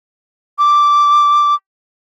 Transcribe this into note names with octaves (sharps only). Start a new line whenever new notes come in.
D6